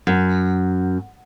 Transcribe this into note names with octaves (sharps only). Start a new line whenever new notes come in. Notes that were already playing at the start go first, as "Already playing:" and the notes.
F#2